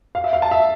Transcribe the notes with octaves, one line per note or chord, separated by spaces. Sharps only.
F5
E5
F5
A5
E5